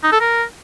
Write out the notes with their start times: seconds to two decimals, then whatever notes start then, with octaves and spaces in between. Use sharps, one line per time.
0.04 D#4
0.12 A4
0.20 A#4